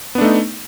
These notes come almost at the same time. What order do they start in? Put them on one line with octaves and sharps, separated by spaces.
B3 D4 A3 D#4